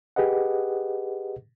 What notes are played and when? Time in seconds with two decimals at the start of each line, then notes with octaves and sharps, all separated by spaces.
0.16 G4 G#4 B4 D#5 F#5